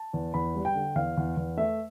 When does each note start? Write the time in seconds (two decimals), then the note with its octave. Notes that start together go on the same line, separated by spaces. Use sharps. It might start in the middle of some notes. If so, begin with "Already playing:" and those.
Already playing: A5
0.13 E2
0.34 E2 B5
0.55 G3
0.65 G5
0.75 D3
0.95 E2 F5
1.17 E2
1.37 E2
1.57 A3 E5